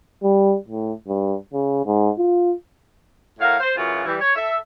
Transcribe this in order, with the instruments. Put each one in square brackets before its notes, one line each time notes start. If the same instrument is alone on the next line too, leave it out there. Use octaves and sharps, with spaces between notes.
[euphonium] G3
A2
G2
C#3
G#2
F4
[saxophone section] A2 F#4 A#4 F5
C5
F#2 C#3 E3 F4 F#4
E3 G3
C#5
A4 E5